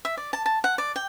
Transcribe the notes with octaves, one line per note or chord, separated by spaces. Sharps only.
E5
D5
A5
A5
F#5
D5
G5